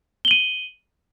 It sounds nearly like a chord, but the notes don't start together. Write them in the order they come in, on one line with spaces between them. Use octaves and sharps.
G7 F#7 D#7